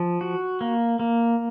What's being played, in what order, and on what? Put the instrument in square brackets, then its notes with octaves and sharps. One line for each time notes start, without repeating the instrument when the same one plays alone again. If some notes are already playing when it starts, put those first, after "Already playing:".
Already playing: [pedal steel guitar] F3
F#4
A#3
A#3